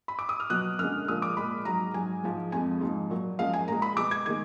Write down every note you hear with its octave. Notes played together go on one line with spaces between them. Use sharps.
B5
D6
D#6
F6
B2 F#3 F#6
F#2 D3 G#3 F6
A#2 F3 G#3 D#6
D6
A#2 G#3 B5
G#2 F#3 A#5
G#2 F#3 G#5
G#2 F3 G#3
F2 F3 G#3 G#5
G#2 F3 G#3
A#2 F#3
F#2 F3 G#3 F5
G#5
A#2 G#3 A#5
B5
B2 G#3 D6
G#6
D#3 G#3 G#6